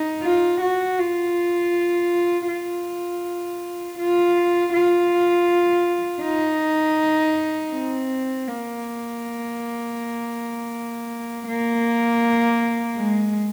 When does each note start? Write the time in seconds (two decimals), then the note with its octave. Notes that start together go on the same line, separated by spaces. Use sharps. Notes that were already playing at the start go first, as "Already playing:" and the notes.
Already playing: D#4
0.22 F4
0.61 F#4
0.98 F4
2.48 F4
3.98 F4
4.73 F4
6.23 D#4
7.72 C4
8.47 A#3
11.47 A#3
12.96 G#3